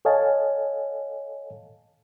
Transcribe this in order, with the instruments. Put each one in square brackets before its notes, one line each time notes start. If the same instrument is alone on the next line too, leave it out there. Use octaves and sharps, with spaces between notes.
[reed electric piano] A4 C#5 D#5 F5 G#5 A5